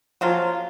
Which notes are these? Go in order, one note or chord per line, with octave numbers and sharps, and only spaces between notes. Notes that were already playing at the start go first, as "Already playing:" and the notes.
C#3 F3 F#3 A#3 F4